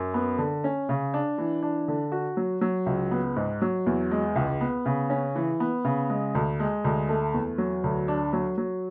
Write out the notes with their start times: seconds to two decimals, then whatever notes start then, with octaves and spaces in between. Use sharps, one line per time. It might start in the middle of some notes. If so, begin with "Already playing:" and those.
Already playing: F#2
0.14 B3
0.38 D3
0.64 C#4
0.89 C#3
1.14 D4
1.38 E3
1.62 D4
1.88 D3
2.12 F#4
2.37 F#3
2.61 F#3
2.86 C#2
3.11 B3
3.36 G#2
3.62 F#3
3.86 E2
4.11 G#3
4.36 C#2
4.61 B3
4.86 C#3
5.10 C#4
5.36 E3
5.60 B3
5.85 C#3
6.10 G#3
6.35 D2
6.60 G#3
6.84 D2
7.09 A3
7.34 E2
7.58 F#3
7.84 D2
8.08 D4
8.33 F#3
8.58 F#3